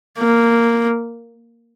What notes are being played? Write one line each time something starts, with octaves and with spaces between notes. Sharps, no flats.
A#3